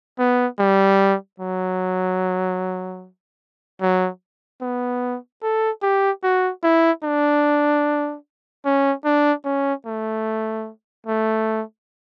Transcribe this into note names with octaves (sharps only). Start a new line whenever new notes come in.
B3
G3
F#3
F#3
B3
A4
G4
F#4
E4
D4
C#4
D4
C#4
A3
A3